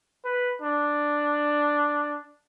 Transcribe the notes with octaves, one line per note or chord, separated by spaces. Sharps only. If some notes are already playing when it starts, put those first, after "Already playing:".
B4
D4